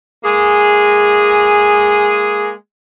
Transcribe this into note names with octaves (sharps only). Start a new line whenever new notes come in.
G#3 A#3 G#4